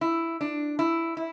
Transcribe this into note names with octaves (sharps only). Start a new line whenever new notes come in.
E4
D4
E4
E4